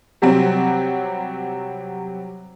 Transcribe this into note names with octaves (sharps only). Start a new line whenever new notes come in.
C3 F#3 G3 C4